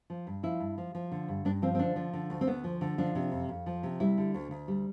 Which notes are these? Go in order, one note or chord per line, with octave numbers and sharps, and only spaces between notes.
F3
G2
F3 E4
G2
F3
F3
D3
G2
G2 D4
F3 C4
C4
D3 D4
F3
D3
D2
C4
D2 B3
F3
D3
F3 D4
C3
F2
F2
F3
C3
G3 E4
D3
D2
D2
G3